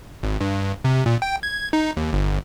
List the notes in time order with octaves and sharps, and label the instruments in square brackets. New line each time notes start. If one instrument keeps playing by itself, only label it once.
[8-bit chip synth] G#1
G2
C3
A#2
G5
G#6
D#4
D#2
G1